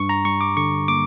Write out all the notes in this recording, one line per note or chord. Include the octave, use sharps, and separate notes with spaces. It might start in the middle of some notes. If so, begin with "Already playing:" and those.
Already playing: G2 C#6
A#5
G3 C#6
D6
D3 C#6
A#3 D6